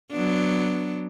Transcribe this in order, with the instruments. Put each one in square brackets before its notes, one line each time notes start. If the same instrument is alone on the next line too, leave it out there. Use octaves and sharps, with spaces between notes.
[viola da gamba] F#3 B3 D4